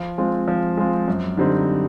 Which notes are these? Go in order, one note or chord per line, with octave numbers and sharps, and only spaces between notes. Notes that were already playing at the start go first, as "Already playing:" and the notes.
Already playing: F3
G#3 C4 F4
F3
G#3 C4 F4
F#2
D3 G3 C4 D#4